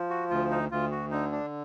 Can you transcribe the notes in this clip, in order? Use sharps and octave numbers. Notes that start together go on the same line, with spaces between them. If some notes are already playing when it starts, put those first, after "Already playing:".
Already playing: F3
F#4
D2 F4
D#4
D2 F4
F#4
D3 D#4
D4